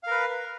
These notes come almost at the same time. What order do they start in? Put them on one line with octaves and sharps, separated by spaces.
F5 A#4 B4